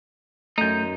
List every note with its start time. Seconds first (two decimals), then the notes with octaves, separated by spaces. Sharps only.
0.58 F#2 A3 D#4 G6